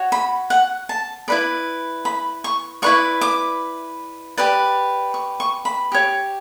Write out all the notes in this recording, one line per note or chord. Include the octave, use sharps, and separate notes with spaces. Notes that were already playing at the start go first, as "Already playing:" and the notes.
Already playing: F#4 C#5
B5
F#5
A5
E4 B4 D5 B5
B5
C#6
E4 B4 D5 C#6
D6
G4 B4 D5
C#6
C#6
B5
G4 C#5